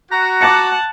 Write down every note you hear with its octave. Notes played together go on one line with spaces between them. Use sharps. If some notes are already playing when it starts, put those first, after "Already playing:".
F#4 A#5
F#5 A5 D6 A6 C#7